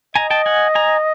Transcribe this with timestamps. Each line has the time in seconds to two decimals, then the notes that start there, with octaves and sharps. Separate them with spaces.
0.15 D#5 G#5 A#5
0.30 G5 A5
0.46 F#5 G#5
0.75 G#5 A#5